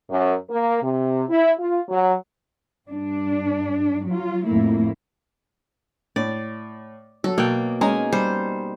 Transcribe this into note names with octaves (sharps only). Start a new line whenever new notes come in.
F#2
A#3
C3
E4
F4
F#3
G2 D4
F#3 F4
F2 A2 A3 A#3 E4
A2 D5
F#3 A4
B2 A#3 D5 G5
G#3 C#4 D#4 G#5 A#5
G3 C5